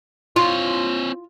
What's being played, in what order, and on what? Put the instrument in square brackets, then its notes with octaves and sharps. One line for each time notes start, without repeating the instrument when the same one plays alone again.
[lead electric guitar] C4 C#5 [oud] F4